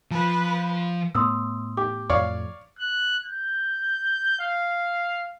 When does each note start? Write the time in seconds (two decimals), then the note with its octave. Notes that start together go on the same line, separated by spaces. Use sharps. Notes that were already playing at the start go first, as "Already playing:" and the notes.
0.11 F3 B4
1.15 A2 B3 C6 D#6 E6
1.77 G4 D6
2.10 F2 A2 C#5 D5 F5
2.79 F#6
3.25 G6
4.40 F5